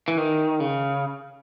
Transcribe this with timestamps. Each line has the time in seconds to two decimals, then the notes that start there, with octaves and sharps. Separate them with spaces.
0.08 E3
0.17 D#3
0.60 C#3